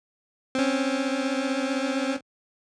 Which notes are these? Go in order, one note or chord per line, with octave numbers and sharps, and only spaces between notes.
C4 C#4